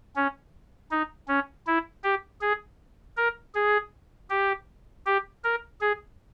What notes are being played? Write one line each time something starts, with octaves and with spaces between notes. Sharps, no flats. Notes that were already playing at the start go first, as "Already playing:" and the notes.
C#4
D#4
C#4
E4
G4
G#4
A#4
G#4
G4
G4
A#4
G#4